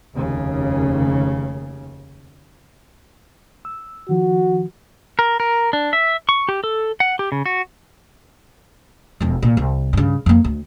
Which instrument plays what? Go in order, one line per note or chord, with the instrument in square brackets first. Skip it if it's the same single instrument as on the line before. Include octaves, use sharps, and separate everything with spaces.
[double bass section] F1 D#2 C#3
[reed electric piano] E6
[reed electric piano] D#3 F3 [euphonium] F#4
[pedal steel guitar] A#4
A#4
D4
E5
C#6
G4
A4
F#5
G4
C#3
F#4
[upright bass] E1 F2
A#2
C2
G2 C#3
F2 A#3
D2